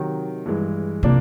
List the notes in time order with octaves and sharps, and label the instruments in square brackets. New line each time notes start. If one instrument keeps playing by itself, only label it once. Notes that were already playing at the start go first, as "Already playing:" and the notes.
Already playing: [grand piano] C3 D#3 F#3
G2 E3 G#3
[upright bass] C3 [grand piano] F3 A#3 D4